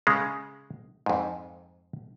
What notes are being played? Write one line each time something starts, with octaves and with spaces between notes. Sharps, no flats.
C#3 G#3
F2 G#2